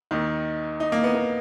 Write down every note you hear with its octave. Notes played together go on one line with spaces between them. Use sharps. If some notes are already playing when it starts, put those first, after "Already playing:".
D#2 D#3
D#4
A#3
B3
B3